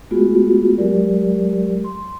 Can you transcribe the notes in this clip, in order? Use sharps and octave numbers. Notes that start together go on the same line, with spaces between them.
G#3 A3 B3 F4 F#4 G#4
F#3 G#3 G4 A#4 D5
C6